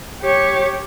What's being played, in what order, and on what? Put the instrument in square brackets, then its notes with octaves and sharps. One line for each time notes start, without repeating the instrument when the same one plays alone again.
[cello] G4 C#5